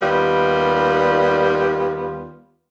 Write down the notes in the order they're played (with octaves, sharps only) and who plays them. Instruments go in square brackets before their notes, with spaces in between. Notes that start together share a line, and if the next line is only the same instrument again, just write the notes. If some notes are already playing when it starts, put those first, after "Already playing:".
[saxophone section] D#2 D#3 G3 B3 F4